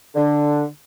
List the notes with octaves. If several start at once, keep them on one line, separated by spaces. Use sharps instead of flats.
D3